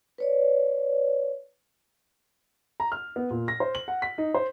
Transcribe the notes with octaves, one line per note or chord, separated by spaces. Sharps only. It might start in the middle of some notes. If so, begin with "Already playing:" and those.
B4 C#5 D5
A#5
F6
B3
A#2
A#6
C5
F#7
F#5
B6
D#4
C5